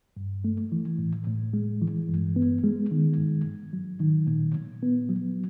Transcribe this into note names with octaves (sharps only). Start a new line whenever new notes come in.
G2
A3
E3
A2
A2
G#3
E3
G2
B3
G#3
D#3
G#2
G#2
F#3
D#3
A#2
A#2
B3
F#3